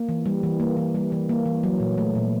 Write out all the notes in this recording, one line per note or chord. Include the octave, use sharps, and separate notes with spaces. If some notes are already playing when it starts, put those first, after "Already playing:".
Already playing: A#3
E3
G3
E3
A#3
E3
G3
E3
A#3
E3
F#3
A#2
A3
A#2